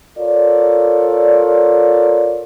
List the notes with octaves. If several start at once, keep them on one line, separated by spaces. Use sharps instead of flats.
F4 A4 A#4 C#5 D5